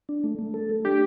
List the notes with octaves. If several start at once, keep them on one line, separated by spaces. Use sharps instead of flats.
D4
A3
A3
A4
A3
D4 G4